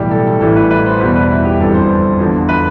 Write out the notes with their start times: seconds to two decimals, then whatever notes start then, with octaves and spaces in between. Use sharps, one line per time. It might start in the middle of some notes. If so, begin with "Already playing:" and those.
Already playing: B1 A2 E3 G3 G4
0.11 A4
0.27 A4
0.40 A1 A2 E3 G3 A4
0.56 B4
0.71 B4
0.86 C5
1.00 E2 B2 G3 B4
1.16 B4
1.31 E4
1.45 G4
1.59 G1 F2 E3 G3 A4
1.74 C5
2.19 E2 D3 F3
2.49 B4